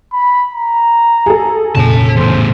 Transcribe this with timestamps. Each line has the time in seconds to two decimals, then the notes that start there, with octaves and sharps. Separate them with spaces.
0.13 B5
0.54 A#5
1.26 G#4 A4
1.75 F1 A#2 C#3 C#5 A5
2.17 E2 A2 C5